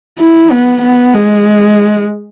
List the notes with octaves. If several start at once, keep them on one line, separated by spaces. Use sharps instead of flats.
E4
B3
B3
G#3